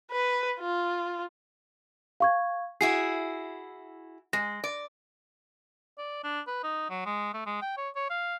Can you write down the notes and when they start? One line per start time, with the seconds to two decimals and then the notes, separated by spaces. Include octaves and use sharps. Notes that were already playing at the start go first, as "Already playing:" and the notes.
0.11 B4
0.60 F4
2.20 F5 C#6 G#6
2.81 E4 F#4 G#4 C7
4.33 G#3 A#6
4.64 D5
5.98 D5
6.24 D4
6.47 B4
6.63 D#4
6.90 F#3
7.06 G#3
7.34 A3
7.46 G#3
7.62 G5
7.77 C#5
7.96 C#5
8.10 F5